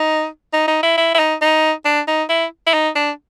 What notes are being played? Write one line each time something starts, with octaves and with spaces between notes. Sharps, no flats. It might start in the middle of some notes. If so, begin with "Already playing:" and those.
Already playing: D#4
D#4
D#4
E4
E4
E4
D#4
D#4
D4
D#4
E4
E4
D#4
D4